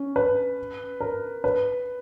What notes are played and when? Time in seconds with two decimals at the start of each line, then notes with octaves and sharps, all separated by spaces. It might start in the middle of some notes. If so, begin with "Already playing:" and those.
Already playing: C#4
0.16 B4
1.00 A#4
1.44 B4